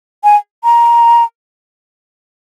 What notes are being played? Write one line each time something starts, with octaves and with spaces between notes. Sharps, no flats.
G#5
A#5